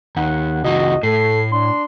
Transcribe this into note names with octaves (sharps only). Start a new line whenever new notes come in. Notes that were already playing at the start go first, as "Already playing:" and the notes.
D#2 F#5
C#2 E3 F#4 D#5
A2 A4 C7
D4 C6